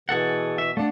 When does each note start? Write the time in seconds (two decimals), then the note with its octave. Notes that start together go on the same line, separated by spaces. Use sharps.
0.09 B2 E3 G#4 A4 F#5
0.58 E5
0.77 A3 D4 D5 F5 F#5